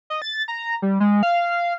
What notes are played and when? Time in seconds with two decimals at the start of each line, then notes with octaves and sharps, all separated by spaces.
0.10 D#5
0.22 A6
0.48 A#5
0.82 G3
1.00 G#3
1.23 F5